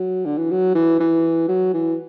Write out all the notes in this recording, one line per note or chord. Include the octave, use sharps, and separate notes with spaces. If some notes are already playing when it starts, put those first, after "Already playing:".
Already playing: F#3
D3
E3
F#3
E3
E3
F#3
E3